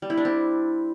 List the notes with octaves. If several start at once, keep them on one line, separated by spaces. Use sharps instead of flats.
G3
E4
D4
C4